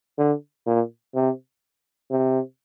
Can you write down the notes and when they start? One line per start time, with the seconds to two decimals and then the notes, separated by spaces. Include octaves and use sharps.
0.18 D3
0.66 A#2
1.15 C3
2.10 C3